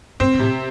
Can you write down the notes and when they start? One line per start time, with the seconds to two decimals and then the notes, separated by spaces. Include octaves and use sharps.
0.20 G2 C4
0.34 B2
0.39 A2 C3